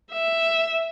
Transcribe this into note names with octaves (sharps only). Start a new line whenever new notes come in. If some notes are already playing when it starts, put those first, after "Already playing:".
E5